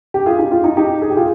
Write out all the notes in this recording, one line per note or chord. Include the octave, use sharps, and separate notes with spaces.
G4
F4 G#4
D#4 G4
F4
D#4
D#4 G4
G#4
G4
F4 G#4